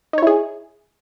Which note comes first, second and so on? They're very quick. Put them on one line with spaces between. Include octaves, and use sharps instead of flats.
D#4 C#5 E4 G#4